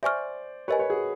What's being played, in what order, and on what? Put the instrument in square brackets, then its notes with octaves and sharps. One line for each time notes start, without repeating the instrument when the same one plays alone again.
[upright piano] C5 D5 [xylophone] E5 G#5 C#6 F6
[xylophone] G4 A#4 D#5 G#5 [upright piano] B4 C#5
[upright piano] B4 C#5
F#4 G#4